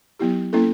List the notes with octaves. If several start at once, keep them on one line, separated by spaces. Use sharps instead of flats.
F#3 B3 E4 G4
A#3 C#4 E4 A4